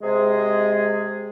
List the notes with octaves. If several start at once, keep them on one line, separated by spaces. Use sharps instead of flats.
C3 G#3 G#4